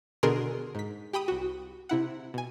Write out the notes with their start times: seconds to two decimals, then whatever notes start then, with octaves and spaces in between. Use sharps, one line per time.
0.23 B2 D3 G#4 A#4 C6
0.75 G#2 B6
1.13 G4 G5 B5 D#6
1.28 C2 F#4
1.89 C3 E4 F#5
2.34 B2 G#5